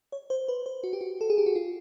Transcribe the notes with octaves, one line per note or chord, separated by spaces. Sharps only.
C#5
C5
B4
C5
F#4
G4
F#4
A4
G#4
G4
F#4
F4